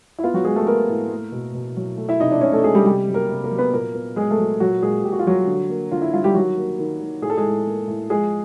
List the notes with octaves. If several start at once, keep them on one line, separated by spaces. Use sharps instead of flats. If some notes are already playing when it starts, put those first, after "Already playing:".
E4
B3 F4
F#3 F#4
F#3 G#3 G#4
A3 A4
A#3 B3 A#4
A2
A3
B2
B2
F#3
A3
E4 E5
C3 D#4 D#5
D4 D5
C3 C#4 C#5
A3 A4
G#3 A3 G#4
G3 G4
C3 G3 G4
F#3
A#3 A#4
C3
A#3 A#4
F#3
B3 B4
A#2 A#3 A#4
B3
F#3 G#3 G#4
A3 A4
F#3
A#2 F#3 F#4
A#2 G#3 G#4
A#2 G4
F#4
F4
F#3 G3 F#4
D3
A#3
D3 F4
E4
G3 F4
G3 G4
D#3 F#3 F#4
A#3
D#3
D#3
A2 G#4
A4
G#3 G#4
A2
A#3
A2
F3 G#3 G#4